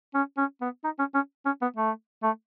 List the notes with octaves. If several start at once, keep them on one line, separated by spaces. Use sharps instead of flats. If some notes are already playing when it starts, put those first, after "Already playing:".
C#4
C#4
B3
D#4
C#4
C#4
C#4
B3
A3
A3